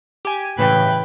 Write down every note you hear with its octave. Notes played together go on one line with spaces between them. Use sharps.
G4 G#5
A2 C#3 E3 B4 G5